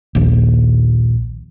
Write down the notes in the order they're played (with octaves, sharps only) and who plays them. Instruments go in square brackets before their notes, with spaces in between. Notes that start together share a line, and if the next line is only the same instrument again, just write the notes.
[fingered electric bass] A#1 D#2